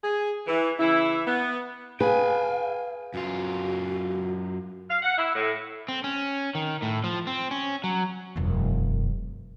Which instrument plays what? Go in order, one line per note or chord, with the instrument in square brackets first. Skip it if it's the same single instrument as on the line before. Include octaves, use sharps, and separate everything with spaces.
[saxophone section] G#4
E3
C#3 E3 E4
B3
[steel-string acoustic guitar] G#4 [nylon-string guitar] B4 [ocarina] F5 [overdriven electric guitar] G5 G#5
[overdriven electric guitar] F#2 F4 [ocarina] F#4
[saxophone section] F5
F#5
E4
A2
[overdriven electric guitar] C4
C#4
D#3
A2
F3
C4
C#4
F#3
[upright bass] E1 F#2